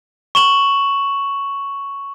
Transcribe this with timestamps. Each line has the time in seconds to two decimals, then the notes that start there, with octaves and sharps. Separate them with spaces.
0.35 C#6 E7 F#7